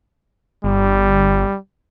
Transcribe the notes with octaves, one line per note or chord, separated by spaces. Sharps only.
G1 G3